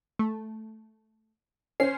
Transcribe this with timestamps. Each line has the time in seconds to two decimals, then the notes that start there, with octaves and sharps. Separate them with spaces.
0.19 A3
1.80 C#4 C5 C7